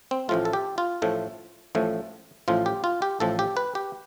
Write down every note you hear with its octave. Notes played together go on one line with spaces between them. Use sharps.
C4
A1 A2 F3 A3 F4
A4
G4
F4
A1 A2 F3 A3
A1 A2 F3 A3
A1 A2 F3 F4
G4
F4
G4
A1 A2 F3 A4
G4
B4
G4